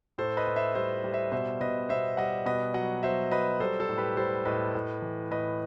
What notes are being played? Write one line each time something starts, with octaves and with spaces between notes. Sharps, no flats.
A2 A4 C5
B4 D#5
A2
C5 E5
G3 C5 E5
G3
C5 E5
B2 C5 E5
B2 B4 D#5
B2 C5 E5
G3 D#5 F#5
B2 B4 D#5
F#3 D#5 F#5
F#3 C5 E5
F#3 B4 D#5
G3 A4 C5
A4 C5
A2
G4 B4
G3 A4 C5
A2 B4 D#5
A2
E3
A2 B4 D#5